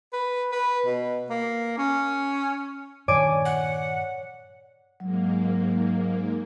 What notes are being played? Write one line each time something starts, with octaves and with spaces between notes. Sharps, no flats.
B4
B4
B2
A#3
C#4
G2 A#2 D#3 C#5 D5 G#5 D6
F#5
G#2 F#3 A#3